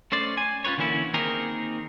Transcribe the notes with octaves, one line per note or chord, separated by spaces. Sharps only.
A3 C#4 C5 D5
G#5
C#4 F4 G4 B4 C#5
D3 E3 A#3 C#4 E4 F#4
D#3 A#3 C4 D#4 G#4 A#4